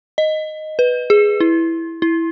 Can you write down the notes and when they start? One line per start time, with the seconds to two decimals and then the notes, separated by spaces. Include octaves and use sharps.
0.18 D#5
0.79 B4
1.10 G#4
1.40 E4
2.02 E4